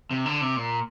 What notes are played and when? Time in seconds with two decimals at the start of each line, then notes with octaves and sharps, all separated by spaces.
0.11 C3
0.25 D3
0.41 C3
0.56 A#2